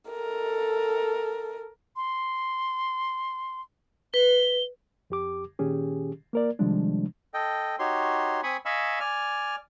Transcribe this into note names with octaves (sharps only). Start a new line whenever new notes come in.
A4 A#4
C6
B4 G7
F2 G4 D6
A#2 D#3 C#4 G4 G#4
A#3 A#4 D5
C3 D#3 F3 G3 G#3 D4
A4 D#5 G5
D#4 F#4 G4 C#5 C6
C4 G#5 B5 C#6 D#6
D#5 F5 G#5 B5 C#6 E6
D5 G#5 F6